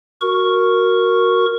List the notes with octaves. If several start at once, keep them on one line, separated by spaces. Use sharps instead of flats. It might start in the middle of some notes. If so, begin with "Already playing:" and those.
F#4 A#4 C#6